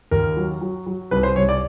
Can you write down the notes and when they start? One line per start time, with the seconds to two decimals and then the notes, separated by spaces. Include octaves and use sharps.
0.11 D#2 A#4
0.37 F#3
0.61 F#3
0.86 F#3
1.11 C2 B4
1.23 C5
1.36 C2 C#5
1.49 D5